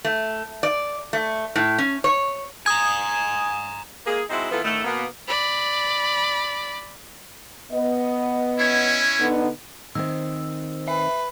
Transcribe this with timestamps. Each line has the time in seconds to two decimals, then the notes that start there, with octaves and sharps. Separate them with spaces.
0.05 A3
0.63 D5
1.13 A3
1.56 A2
1.78 C#4
2.04 C#5
2.66 G#5 A#5 D#6 G#6
4.07 A#3 G#4
4.30 G#3 C4 D#4 E4 F#4
4.52 E3 A#3 B3 E4 F4 A4
4.64 A2 D3 D#3 A3
4.84 B2 A#3 B3
5.27 D5 B5
7.72 B3 D#5
8.59 C#4 E4 C#5
9.19 D3 B3 D#4
9.95 D#3 C4 C5 E6
10.88 B4 E5